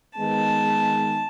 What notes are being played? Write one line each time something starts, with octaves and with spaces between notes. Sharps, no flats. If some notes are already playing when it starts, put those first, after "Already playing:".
D#3 G#3 B3 A5